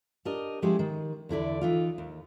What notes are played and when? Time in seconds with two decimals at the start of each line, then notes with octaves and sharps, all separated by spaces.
0.25 D4 G4 A#4 D#5
0.62 F3 G#3 C#4 E4 G4 G#4
0.79 D#3
1.29 E2 D3 E4 D5
1.61 E3 D#4 F4
1.98 D#2